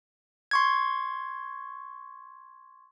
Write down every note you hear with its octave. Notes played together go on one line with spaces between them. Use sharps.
C6 C#6 G#6